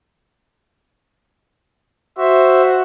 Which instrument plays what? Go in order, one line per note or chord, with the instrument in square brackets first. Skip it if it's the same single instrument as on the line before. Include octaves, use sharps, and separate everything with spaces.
[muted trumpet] F#4 [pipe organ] C5 E5